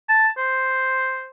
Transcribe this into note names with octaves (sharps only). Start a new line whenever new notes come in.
A5
C5